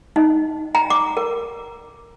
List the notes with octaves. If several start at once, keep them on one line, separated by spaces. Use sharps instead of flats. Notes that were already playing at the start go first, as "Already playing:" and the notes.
D#4
A#5
D6
A#4